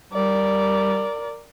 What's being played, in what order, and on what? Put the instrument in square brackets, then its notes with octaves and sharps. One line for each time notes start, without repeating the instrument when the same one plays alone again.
[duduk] G3 [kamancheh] A#4 D5